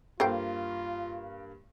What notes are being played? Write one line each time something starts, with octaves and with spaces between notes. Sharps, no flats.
G2 A#3 F4 A4 C5 G5